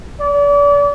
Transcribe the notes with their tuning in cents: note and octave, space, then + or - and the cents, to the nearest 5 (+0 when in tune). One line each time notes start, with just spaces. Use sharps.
D5 -35